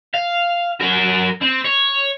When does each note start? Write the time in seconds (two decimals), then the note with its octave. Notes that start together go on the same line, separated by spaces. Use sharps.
0.14 F5
0.81 F#3 A#4
1.42 C4
1.65 C#5